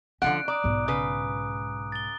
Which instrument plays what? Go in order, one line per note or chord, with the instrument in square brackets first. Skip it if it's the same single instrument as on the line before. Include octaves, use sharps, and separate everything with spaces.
[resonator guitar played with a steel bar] D3 F3 F#5 [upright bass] C#4 D#4 [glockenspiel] F#6 D7
[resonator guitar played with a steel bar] D5 [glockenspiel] A#5 D6 D#6
[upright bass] B1 G#2
[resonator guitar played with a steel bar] C#3 B4 [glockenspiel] D#6
[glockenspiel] A6 G7